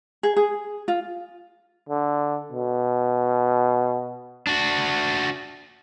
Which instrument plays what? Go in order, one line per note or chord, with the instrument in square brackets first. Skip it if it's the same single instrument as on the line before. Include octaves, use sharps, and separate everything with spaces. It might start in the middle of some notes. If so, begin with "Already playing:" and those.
[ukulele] G#4
G#4
F4
[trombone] D3
B2
[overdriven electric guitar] D4 F#4